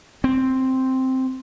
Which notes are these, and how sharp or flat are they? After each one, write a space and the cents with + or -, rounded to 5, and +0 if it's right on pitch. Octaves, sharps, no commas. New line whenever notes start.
C4 +0